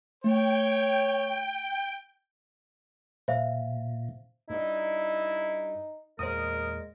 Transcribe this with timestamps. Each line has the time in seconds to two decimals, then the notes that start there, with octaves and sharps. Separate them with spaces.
0.24 A3 C#5 G5
3.28 A#2 C5 E5 F5
4.50 G2 D#4 E4
6.19 E2 A#2 G#3 A#4 C5 D#6